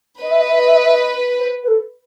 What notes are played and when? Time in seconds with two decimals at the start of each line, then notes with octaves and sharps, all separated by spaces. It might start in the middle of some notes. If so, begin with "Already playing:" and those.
0.22 B4 D#5
0.30 E5
0.40 D#5
0.49 E5
0.58 D#5
0.67 E5
0.75 D#5
0.85 E5
0.93 D#5
1.38 C5
1.63 B4
1.67 A4